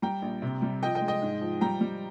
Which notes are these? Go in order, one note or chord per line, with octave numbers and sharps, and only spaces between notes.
G3 G5 A#5
A#1
C3
G3
F3 D#5 G5
D#5 G5
G#3
D#5 G5
G#2
F3
G3 G5 A#5
G3